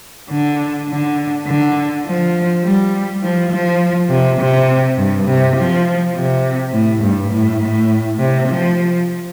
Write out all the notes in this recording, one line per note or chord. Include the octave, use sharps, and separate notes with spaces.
D3
D3
D3
F3
G3
F3
F3
C3
C3
G2
C3
F3
C3
A2
G2
A2
A2
C3
F3